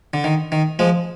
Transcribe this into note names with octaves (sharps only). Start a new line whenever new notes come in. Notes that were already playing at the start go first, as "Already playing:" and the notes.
D3
D#3
D#3
F3 G#3